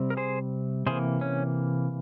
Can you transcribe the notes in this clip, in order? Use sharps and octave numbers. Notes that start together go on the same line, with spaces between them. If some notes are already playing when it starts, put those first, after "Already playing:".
Already playing: C3 G3 C4
A#4
G#4 C5
C3 E3 A#3 G#4 C5
C#4